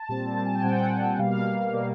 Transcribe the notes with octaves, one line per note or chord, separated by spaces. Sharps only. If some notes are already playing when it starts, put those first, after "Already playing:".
Already playing: A5
A#2 G3 C4
A5
G#5
G5
A#2 G3 C4 F#5
B2 G3 A#3 F5
B2 G3 A#3